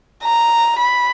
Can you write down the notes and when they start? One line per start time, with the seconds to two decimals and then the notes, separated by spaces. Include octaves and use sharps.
0.24 A#5
0.79 B5